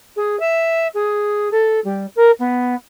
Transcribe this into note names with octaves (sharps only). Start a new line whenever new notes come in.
G#4
E5
G#4
A4
G3
A#4
B3